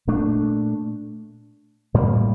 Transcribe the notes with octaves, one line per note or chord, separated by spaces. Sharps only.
A#2 A3 D4
A2 G3 A#3